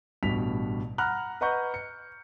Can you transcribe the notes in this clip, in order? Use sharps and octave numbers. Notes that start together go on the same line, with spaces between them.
A1 G2 B2 B6 F7
F#5 A#5 B5 F6 F#6
B4 D#5 F#5 A#5 C#6 G6
C#7